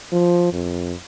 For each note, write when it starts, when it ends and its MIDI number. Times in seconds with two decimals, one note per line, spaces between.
0.12 0.50 53
0.53 0.95 41